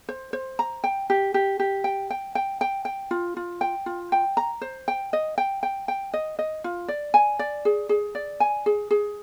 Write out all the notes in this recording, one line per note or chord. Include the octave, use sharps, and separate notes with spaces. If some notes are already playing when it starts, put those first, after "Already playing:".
C5
C5
A#5
G5
G4
G4
G4
G5
G5
G5
G5
G5
F4
F4
G5
F4
G5
A#5
C5
G5
D#5
G5
G5
G5
D#5
D#5
F4
D5
G#5
D5
G#4
G#4
D5
G#5
G#4
G#4